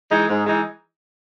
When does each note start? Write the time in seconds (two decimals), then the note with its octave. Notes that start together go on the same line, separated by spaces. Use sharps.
0.10 E3 G#3 D#4
0.28 G#2
0.45 E3 G#3 D#4